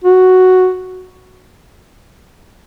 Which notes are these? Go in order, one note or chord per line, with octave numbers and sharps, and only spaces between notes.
F#4